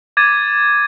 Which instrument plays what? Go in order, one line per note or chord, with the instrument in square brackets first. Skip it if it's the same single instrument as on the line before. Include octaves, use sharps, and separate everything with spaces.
[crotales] D6 G#6 A6 D#7